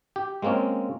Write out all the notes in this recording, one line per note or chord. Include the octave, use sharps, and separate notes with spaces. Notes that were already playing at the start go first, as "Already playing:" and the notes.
G4
G#3 A#3 C4 C#4 F4